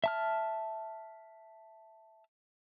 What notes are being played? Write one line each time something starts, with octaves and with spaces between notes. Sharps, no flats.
E5 A5 F6